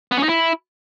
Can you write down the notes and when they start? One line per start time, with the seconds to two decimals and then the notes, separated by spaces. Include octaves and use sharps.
0.12 B3
0.17 C#4
0.23 D#4
0.29 E4